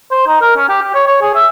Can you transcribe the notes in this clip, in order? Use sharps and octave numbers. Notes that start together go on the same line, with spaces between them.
C5
D#4
A#4
C#4
G4
G4
C#5
C#5
G#4
E5